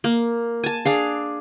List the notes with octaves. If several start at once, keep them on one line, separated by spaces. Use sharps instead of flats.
A#3
G#5 A5
D4 G#4 F5